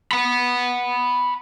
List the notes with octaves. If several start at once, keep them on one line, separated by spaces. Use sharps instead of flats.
F#5 B5